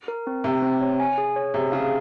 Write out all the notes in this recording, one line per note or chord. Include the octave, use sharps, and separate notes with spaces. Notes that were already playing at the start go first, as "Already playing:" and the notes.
A#4
C4
C3 C4
C4
C#5
G#5
G#4
C#5
C3 G#4
C#3 F5